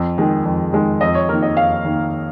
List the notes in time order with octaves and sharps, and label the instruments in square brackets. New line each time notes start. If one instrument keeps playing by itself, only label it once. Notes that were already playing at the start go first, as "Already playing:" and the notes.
Already playing: [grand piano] F2
D#3 G#3
F2
D#3 G#3
F2 D#5
C#5
D#3 A#3 A#4
D#5
F2 F5
D#3 A#3